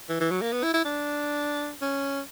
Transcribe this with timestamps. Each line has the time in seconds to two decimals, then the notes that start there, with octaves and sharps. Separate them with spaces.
0.09 E3
0.20 E3
0.31 F#3
0.41 A#3
0.52 B3
0.63 E4
0.74 E4
0.85 D4
1.82 C#4